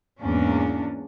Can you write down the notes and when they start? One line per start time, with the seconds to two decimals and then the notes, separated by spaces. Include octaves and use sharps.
0.21 E2 G#2 A#3 C#4 D4